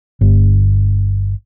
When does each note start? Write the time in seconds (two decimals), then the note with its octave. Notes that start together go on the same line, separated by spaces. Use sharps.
0.21 G1